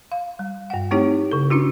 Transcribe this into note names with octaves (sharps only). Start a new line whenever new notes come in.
F5
G3
G2 F#5
A3 C4 D#4 E4 G4 C#5
C#3 A4
C#4 D4 E4 F#4